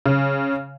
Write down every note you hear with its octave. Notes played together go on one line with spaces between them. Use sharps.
C#3